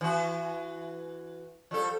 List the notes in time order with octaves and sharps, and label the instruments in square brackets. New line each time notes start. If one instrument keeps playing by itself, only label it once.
[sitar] E3 F#4
F3 G3 A4